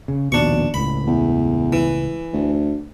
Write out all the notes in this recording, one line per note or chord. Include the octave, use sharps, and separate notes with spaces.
C#3
A#1 D#2 B2 D4 C#6
C#2 A2 B5
E2
E3
D2